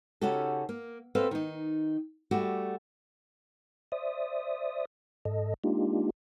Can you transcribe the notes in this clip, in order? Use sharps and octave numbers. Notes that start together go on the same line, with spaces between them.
C#3 C#4 D#4 F#4 G4 A4
A#3
C4 A4 B4 D#5 F5
D#3 D#4
G3 A3 F#4 D5
C5 D5 E5 D#6
G#2 A4 D#5
G#3 A#3 D4 D#4 F4 G4